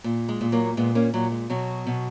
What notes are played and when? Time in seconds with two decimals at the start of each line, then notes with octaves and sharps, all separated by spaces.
0.04 A#2
0.29 G#3
0.41 A#2
0.52 F#3 A#3
0.77 A#2 G#3 B3
0.95 A#3 C#4
1.14 A#2 F#3
1.32 G#3
1.50 B2 F#3
1.87 B2